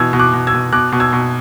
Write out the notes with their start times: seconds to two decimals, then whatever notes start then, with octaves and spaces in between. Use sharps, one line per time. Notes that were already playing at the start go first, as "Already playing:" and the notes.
Already playing: B2 E3 E6 G#6
0.13 B2
0.19 D6 F#6
0.33 B2
0.47 E6 G#6
0.54 B2
0.73 B2 D6 F#6
0.92 B2
1.00 E6 G#6
1.13 B2